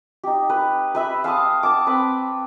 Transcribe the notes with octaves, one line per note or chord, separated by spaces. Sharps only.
D#4 G4
B4
B4 E5 B5
F5 A5 C6 D#6
F#5 A5 D6
C4 B4 G5